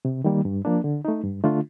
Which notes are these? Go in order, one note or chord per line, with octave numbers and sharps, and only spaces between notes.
C3
D#3 G3 A#3
G2
F3 A#3 D4
D3
A3 D#4
G2
D3 A3 D4 F4